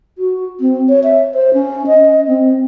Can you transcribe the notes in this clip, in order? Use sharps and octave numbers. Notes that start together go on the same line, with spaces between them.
F#4
C4
C#5
E5
C5
C#4
D#5
C4